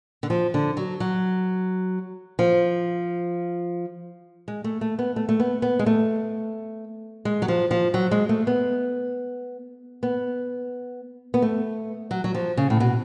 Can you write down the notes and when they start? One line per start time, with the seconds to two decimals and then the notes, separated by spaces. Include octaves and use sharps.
0.23 D3
0.30 F3
0.54 D3
0.77 F#3
1.00 F#3
2.39 F3
4.48 G#3
4.64 A3
4.81 A3
4.99 B3
5.16 A3
5.29 A3
5.40 B3
5.62 B3
5.79 G#3
5.86 A3
7.25 G#3
7.42 F#3
7.48 F3
7.71 F3
7.94 F#3
8.11 G#3
8.29 A3
8.47 B3
10.03 B3
11.34 B3
11.42 A3
12.11 F#3
12.24 F#3
12.34 F3
12.57 C#3
12.70 A2
12.80 B2